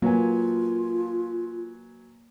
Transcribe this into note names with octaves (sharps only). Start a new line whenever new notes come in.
F#3 A#3 F4 B4 G#5